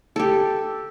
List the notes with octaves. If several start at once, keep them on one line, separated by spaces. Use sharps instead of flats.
G4 A4